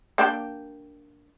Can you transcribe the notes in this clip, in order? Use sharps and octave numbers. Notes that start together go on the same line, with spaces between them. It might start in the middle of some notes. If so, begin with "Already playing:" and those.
A#3 D4 G4